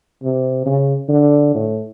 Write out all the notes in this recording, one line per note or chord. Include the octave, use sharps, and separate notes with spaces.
C3
C#3
D3
A2